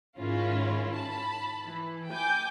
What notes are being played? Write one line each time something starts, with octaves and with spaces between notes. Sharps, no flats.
G#2 D#3 C#4 E4 F4
A5 B5
E3
G5 G#5 D6 G6